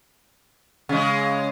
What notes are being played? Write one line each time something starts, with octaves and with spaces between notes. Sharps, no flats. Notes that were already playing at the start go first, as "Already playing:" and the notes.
C#3 G#3